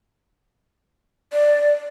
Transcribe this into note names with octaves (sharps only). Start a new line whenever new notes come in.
D5